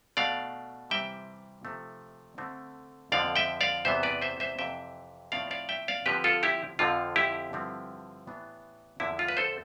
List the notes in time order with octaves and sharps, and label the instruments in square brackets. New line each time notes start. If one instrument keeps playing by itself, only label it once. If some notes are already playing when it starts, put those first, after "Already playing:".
[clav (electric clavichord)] B2 A3 D4 D5 F5
C3 E3 G3 C4 E5 G5
C3 F3 A3 C4
D3 A3 C4
F2 D3 F3 D5 F5
E5 G5
D5 F5
E2 C3 E3 B3 C5 E5
B4 D5
C5 E5
C5 E5
F2 C3 E3 E5 G5
A2 F3 C4 D5 F5
D5 F5
E5 G5
D5 F5
D3 F3 C4 G4 B4
F4 A4
E4 G4
F2 D3 F3 C4 F4
E4 G4
G2 D3 F3 C4
A2 E3 B3 D4
E2 D3 F3 E4
F4
B4
A4 C5